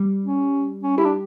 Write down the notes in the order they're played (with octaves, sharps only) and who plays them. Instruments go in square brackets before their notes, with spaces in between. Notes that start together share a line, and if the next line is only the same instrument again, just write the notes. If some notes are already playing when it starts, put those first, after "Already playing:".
Already playing: [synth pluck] G3
[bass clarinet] C#4
C#4
[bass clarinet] E4 [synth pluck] G4
[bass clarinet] D4